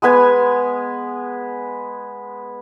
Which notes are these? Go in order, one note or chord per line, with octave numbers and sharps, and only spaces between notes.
G#3 B3 B4 G#5